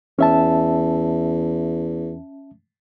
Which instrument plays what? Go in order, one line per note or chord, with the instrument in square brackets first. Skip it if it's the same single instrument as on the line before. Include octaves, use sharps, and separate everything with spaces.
[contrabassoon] E2 [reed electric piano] C#4 E5 A5